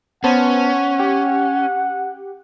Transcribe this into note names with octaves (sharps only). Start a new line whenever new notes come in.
B3 C#4 C5 F#5 A5
G4